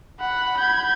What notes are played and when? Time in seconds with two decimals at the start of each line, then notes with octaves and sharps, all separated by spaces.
0.20 F#5 B5
0.58 G6 G#6